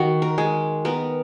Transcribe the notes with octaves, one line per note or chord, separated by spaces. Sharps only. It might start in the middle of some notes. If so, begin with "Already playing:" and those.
Already playing: D#3 F#4
A#4
G#3
B3 A#4